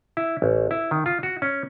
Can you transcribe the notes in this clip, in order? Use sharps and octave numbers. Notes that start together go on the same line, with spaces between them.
E4
A1
E4
D#3
F4
F#4
C#4